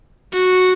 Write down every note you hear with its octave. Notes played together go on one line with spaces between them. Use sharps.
F#4